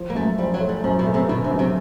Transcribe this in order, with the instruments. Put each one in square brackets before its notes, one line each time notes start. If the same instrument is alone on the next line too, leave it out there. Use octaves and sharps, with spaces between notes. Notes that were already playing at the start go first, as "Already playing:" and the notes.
Already playing: [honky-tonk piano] F3
[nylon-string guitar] A#3
[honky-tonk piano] F#2 [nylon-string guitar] A3
[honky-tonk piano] F3 [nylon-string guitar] G3
[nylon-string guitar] F#3
[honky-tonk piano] A3
[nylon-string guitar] G3
[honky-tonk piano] F#2 [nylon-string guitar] F3
[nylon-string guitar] B2
[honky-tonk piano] A3
[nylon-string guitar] C3
[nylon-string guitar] B2 [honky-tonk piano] D3
[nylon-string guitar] C3
[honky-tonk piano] F#2
[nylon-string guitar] C3